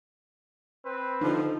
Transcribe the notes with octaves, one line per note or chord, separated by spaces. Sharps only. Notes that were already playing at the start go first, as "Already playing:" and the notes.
C4 B4
D3 F3 D#4